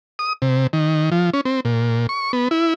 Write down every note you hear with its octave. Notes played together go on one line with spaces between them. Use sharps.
D#6
C3
D#3
F3
C#4
C4
A#2
C#6
B3
E4